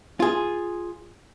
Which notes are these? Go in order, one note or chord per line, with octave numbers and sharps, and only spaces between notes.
F4 G#4